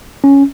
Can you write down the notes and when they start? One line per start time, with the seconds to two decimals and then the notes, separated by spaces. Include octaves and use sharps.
0.24 C#4